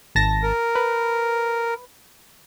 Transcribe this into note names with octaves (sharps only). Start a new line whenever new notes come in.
G#1 A5 A#6
A#4
B4